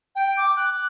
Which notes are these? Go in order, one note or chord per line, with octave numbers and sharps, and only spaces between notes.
G5
D6
F#6